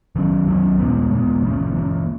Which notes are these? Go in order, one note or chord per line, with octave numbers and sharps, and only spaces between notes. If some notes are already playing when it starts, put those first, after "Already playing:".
D#3 F#3 A#3 C#4
D#3 F#3 A#3 C#4
A#2 G#3 B3
A#2 G#3 B3
E3 A#3 C#4
E3 A#3 C#4